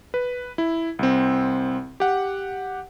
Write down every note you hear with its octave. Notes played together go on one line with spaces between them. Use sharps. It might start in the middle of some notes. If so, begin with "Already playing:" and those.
B4
E4
C2 C4
G4 F#5